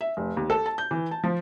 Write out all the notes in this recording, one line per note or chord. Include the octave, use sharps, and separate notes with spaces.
E5
F1
D#2
A4
A5
G6
E3
A5
F3